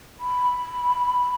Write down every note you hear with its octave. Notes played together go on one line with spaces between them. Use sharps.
B5